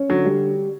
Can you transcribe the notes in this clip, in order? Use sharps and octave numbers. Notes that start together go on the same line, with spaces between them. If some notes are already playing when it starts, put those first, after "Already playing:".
Already playing: C#4
D3 F#3
G3